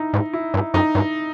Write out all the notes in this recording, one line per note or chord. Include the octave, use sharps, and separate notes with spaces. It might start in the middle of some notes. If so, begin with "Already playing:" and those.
Already playing: D#4 E4
G#2
E4
G2
F#2 D#4
G2